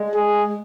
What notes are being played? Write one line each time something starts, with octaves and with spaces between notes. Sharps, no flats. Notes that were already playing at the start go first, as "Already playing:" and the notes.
Already playing: G#3
G#4